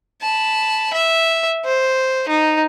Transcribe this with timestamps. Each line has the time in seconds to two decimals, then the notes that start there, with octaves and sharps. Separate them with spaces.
0.22 A5 B5
0.94 E5
1.65 C5
2.28 D#4